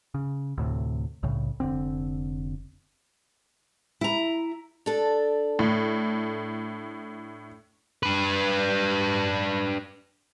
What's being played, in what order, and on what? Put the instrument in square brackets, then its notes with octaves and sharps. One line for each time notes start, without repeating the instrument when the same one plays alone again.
[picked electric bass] C#3
D2 A2 C3
C2 A2 C#3
F1 D3 C4
[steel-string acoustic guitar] E4 A#5
D4 A4
[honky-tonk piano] A2
[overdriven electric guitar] D4 B4